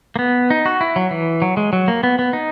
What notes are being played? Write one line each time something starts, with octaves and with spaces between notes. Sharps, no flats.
A#3
B3
D#4
F#4
E4
F#3
E3
F#3
G#3
F#3
A#3
B3
B3
D#4